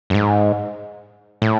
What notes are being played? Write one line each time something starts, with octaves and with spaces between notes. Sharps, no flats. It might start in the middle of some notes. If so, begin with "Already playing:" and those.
F#2
G#2
A2